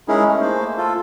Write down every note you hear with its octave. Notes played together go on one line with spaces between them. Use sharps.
G#3 C#4 D#4 E4 G#4 A#4
A3
A3 A#3 C5
F4 A4